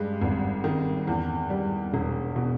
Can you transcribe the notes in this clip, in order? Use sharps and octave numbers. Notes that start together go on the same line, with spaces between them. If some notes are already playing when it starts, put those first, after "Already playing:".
Already playing: G2 G#3
G#1
D#3
E2
G3
E1
B2